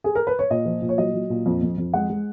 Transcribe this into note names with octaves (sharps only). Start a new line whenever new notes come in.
G#4
A#4
B4
C#5
A#2 D#5
F3
A#2
C#5
F#3 D#5
F#3
A#2
F2
F2
F2
G#3 F#5
G#3